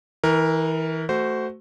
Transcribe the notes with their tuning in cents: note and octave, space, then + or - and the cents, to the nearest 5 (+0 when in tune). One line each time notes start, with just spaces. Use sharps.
E3 -30 A#4 +0
A3 +0 F#4 +15 C5 -10